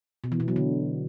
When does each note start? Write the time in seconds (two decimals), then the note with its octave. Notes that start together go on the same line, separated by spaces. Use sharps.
0.24 B2
0.32 E3
0.40 B2
0.48 F#3
0.56 D3